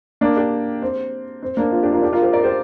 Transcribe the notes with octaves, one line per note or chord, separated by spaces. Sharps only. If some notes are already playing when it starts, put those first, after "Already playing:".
A#3 D4
D4 G4
C4
C4
A#3 D4
C4 F4
D4 G4
F4 A#4
D4 G4
F4 A#4
G4 C5
A#4 D5
G4 C5